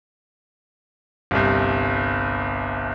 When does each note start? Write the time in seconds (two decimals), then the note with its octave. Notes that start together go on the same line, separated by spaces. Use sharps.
1.31 G1 C2